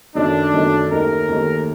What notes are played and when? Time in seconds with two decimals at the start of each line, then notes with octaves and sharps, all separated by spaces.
0.15 F#2 D#3 F#3 A3 D4
0.54 F#2 D#3 F#3 A3
0.91 D#2 D#3 A3 A#4
1.28 D#2 D#3 A3